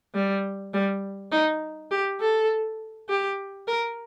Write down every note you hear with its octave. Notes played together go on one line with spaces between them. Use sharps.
G3
G3
D#4
G4
A4
G4
A#4